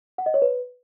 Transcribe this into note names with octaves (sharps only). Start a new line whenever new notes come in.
F#5
D#5
C#5
B4